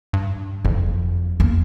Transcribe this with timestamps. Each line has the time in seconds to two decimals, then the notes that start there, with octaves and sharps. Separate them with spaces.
0.13 G2
0.65 F#1 F2
1.40 E2 A#3